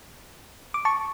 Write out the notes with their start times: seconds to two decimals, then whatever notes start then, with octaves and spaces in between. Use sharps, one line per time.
0.74 D6
0.85 A5 C#6